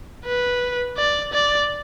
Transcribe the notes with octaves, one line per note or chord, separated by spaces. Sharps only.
B4
D5
D5